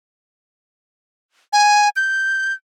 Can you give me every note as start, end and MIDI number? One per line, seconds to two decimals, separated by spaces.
1.53 1.89 80
1.96 2.53 91